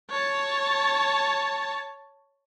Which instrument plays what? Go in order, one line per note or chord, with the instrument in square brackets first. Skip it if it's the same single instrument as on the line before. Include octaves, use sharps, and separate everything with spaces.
[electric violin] C#5 A5